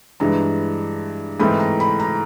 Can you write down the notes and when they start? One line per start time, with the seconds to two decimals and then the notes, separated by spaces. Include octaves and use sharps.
0.20 G2 E3 G#3 A#5
1.40 G#2 E3 A3 C4 B5
1.60 A#5
1.80 B5
2.00 A#5